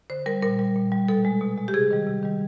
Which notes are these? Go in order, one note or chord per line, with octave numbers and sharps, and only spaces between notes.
D3 C5
G3 A#4
A#2 A#4
G3
A#2
G3
B2 A4
G#3
B2
G#3
G4
C3 G#4
D#3 G3
C3
D#3 G3